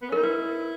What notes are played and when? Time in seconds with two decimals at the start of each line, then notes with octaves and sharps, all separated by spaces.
0.02 B3
0.09 C#4
0.12 D#4 A#4
0.23 E4 B4